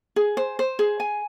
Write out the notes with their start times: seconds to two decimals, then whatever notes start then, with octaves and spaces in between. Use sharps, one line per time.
0.16 G#4
0.37 C5
0.59 C5
0.79 G#4
1.00 G#5